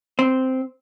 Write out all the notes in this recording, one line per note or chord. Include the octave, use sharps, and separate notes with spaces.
C4